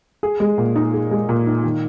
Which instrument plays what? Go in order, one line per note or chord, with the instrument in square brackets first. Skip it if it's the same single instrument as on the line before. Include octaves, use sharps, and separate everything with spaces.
[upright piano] G#4
G#3
A#2
D#4
G#4
G#3
A#2
D#4
D#3